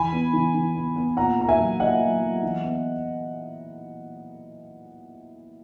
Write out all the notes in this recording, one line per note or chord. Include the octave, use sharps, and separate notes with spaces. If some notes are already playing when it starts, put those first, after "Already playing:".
Already playing: E3 G#5 B5
B3
E3
E3
B3
B3
A#2 F#5 A#5
A#3 A#5
E5 G#5
F#3
A#3 D#5 F#5
F#3
F#3
E3
B3